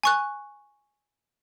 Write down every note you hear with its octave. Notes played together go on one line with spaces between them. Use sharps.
G#5 C#6 F#6